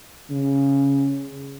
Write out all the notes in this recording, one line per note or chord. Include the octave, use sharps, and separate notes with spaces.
C#3